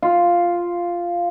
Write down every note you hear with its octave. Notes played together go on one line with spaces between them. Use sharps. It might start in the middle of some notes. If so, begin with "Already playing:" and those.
F4